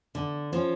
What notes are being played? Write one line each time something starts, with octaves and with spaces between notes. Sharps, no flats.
D3
F3 C#4